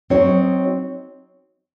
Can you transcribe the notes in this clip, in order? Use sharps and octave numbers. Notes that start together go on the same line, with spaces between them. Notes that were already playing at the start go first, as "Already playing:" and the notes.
F#3 C4 D#4 F#4 C#5